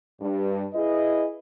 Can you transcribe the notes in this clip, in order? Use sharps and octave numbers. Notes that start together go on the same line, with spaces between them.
G2
E4 G#4 B4 D#5